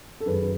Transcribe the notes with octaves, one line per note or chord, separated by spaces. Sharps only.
A4
F#2 D#3 F#3 G#4 B4